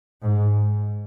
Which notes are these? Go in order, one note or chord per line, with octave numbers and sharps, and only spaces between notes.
G#2